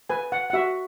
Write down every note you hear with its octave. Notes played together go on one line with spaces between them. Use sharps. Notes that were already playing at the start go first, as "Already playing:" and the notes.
B4 G#5
F#5
F#5
F#4 E5